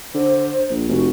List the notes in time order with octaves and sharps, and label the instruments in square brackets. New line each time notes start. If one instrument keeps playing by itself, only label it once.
[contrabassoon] D3 [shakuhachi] C5
[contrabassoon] A#1
[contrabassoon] F1 [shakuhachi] F#4